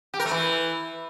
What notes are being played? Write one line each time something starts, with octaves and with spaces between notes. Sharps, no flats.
G4
A#4
A3
E3